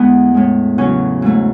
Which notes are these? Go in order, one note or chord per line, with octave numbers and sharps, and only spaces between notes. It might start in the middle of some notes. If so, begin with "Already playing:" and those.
Already playing: E2 D3 G#3 B3
A2 G#3
E2 C#3 F#3 C#4
G#2 E3 A3